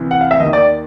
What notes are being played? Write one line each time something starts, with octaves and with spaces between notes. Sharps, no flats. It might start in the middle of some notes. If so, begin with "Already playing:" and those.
Already playing: C2 C3 E3
F#5
F5
E5
D#2 D#3 D#5
D5